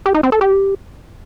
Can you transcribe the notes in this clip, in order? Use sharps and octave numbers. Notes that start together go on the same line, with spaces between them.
G4
D#4
C4
A4
G4